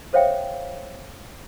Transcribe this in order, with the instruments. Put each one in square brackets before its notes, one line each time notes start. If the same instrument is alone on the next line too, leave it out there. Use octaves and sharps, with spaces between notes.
[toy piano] A4 C5 C#5 E5 F5 G5